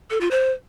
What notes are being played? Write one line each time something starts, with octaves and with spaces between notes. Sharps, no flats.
A4
F4
C5